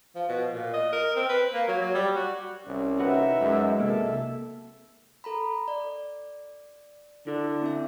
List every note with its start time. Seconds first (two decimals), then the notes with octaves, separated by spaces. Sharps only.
0.16 F3
0.29 B2
0.53 A#2
0.74 D#5
0.92 A#4
1.16 C4
1.29 B4
1.53 A#3
1.68 F#3
1.81 F#3
1.95 G3
2.16 F#4
2.67 C2 C#4
2.99 D#4 F#4 B4 E5
3.40 F#2 G#3
3.79 B1 C3 A#3 A4 E5
5.24 A4 A#5 B5
5.68 D5
7.27 D3 E4
7.62 C4 D4 E5